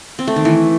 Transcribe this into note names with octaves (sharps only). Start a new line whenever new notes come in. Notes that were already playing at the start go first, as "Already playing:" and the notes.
C4
A3
D#3
E3